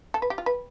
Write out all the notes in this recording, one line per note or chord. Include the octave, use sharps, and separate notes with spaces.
A4
B4
G4
F4
B4